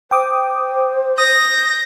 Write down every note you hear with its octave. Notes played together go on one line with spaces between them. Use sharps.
C5 G5 D6 D#6
D#6 G6 A#6